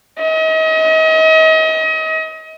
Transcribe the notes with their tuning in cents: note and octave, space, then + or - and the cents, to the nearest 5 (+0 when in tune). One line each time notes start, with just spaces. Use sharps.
D#5 +35